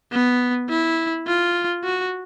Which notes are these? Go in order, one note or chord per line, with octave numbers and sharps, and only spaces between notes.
B3
E4
F4
F#4